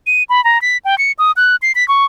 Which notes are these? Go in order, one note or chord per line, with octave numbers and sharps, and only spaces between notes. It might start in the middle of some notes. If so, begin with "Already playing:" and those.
D#7
B5
A#5
B6
G5
C#7
D#6
F#6
C7
B6
C#6